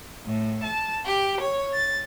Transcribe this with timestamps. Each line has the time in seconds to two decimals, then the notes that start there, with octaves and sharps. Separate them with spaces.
0.25 A2
0.63 A5
1.05 G4
1.41 C#5
1.73 A6